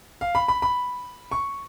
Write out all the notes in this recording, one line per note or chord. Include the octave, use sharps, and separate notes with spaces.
F5
B5
B5
B5
C#6